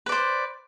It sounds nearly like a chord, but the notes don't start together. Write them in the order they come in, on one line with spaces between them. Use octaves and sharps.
B4 D5 C5